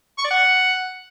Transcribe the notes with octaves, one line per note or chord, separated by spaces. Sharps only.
C#6
D5
F#5